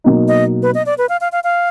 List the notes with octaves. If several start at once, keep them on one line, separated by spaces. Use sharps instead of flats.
B2 F#3 A#3 D#4
D#5
B4
D#5
D5
B4
F5
F5
F5
F5